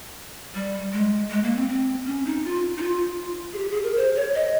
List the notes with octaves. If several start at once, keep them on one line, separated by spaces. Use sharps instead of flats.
G3
G#3
G#3
A#3
C4
C4
C#4
D#4
F4
D#4
F4
G#4
G4
G#4
A#4
C5
C#5
D#5